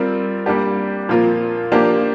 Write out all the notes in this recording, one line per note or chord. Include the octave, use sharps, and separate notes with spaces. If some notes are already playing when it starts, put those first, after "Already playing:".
Already playing: G3 C4 F4 A#4
G3 A#3 D4 G4
A#2 F3 A#3 F4 A#4
F3 A#3 D4 G4 A#4